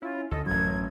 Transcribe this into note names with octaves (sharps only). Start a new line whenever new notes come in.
C#4 E4 F4
D2 A4 D#5
A1 F#2 F#3 G#6